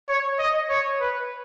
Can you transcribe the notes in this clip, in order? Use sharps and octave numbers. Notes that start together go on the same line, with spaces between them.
C#5
D#5
C#5
B4